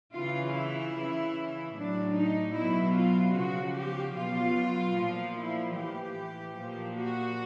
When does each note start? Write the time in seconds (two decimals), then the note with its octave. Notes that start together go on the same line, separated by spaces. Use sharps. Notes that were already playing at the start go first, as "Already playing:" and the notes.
0.14 C#3 E3 F4
0.55 E4
0.95 C#3 E3
1.75 A2 F#3 D4
2.16 D#4
2.55 B2 F#3 E4
2.95 F4
3.35 C#3 F3 F#4
3.76 G4
4.16 B2 F#3 F4
4.96 A#2 F3
5.37 E4
5.76 A2 E3 G4
6.57 A#2 F3
6.96 F#4